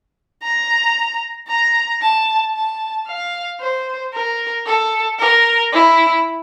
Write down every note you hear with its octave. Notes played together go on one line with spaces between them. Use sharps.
A#5
A#5
A5
A5
F5
C5
A#4
A4
A#4
E4